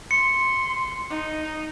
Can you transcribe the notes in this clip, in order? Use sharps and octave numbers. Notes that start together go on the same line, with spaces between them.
C6 C#7
D#4